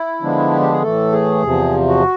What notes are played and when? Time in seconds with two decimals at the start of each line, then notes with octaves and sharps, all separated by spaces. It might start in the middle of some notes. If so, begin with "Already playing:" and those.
Already playing: E4
0.22 D3 F3 G#3 B3 D4
0.51 G4
0.61 G4
0.72 G#4
0.82 A2 E3 A3 A4
1.12 G#4
1.42 E2 C3 F3
1.88 F#4